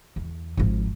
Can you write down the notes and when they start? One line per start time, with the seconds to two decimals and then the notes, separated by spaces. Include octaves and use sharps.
0.16 E2
0.57 G#1 F3